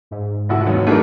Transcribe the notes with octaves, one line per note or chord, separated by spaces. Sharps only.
G#2
F1 E4 F#4
D#2 F#3 B3 D#4
A3 D4 D#4 G#4 A#4